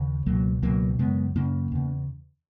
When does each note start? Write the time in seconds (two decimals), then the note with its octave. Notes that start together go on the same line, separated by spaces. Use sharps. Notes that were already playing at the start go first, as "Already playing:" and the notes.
Already playing: D#2 C#3
0.26 C#2 B2 F#3 A#3
0.62 C#2 B2 F#3 A#3
0.99 F#2 C#3 G#3 B3
1.35 F#2 C#3 A#3 C#4
1.72 E2 C#3